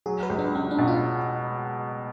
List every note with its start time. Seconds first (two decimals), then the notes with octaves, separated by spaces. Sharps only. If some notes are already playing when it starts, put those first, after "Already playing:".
0.06 F#3 G#4
0.23 B4
0.30 C#2
0.39 D4
0.55 C#2 C#4
0.71 D4
0.78 B2
0.87 F4